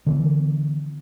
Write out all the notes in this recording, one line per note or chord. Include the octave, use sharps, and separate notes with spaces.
D3 E3 B3